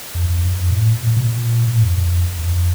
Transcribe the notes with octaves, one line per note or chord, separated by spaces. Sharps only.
F2
F2
F#2
F2
A#2
A2
A#2
A#2
B2
A#2
A2
F2
F2
E2
F2